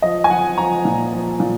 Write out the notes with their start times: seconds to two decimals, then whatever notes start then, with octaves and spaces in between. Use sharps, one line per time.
0.02 F3 D#5
0.24 G#5
0.30 F3 F#5
0.58 F3 A#5
0.85 A#2
1.13 F3
1.40 A#2